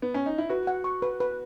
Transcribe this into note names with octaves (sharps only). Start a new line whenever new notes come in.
B3
C#4
D#4
E4
F#4 B4
F#5
C#6
B4
B4